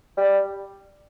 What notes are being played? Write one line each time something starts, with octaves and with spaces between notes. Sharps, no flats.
G3